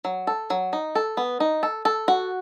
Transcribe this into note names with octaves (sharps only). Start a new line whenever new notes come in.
F#3
A4
F#3
D#4
A4
B3
D#4
A4
A4
F#4